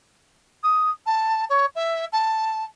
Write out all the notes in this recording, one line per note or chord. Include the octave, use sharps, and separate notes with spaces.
D#6
A5
C#5
E5
A5